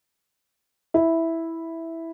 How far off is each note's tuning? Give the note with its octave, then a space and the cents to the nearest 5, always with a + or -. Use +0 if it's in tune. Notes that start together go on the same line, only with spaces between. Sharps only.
E4 -5